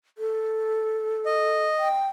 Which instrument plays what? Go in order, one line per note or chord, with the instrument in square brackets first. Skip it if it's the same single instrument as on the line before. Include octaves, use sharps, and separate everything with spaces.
[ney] A4
[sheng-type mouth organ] D#5
[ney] G5